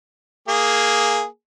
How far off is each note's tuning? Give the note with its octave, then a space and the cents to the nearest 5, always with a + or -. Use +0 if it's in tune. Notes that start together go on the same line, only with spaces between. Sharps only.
A#3 +0 G#4 +0